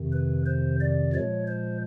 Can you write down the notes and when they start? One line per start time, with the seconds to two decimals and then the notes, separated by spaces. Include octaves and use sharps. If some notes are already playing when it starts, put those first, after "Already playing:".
Already playing: F2 C3 D#3
0.13 B4
0.46 C5
0.80 D5
1.13 A#2 F3 G#3 C#5
1.47 C5